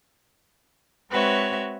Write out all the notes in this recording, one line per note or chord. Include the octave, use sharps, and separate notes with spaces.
G#3 C4 F#4 B4 C#5 E5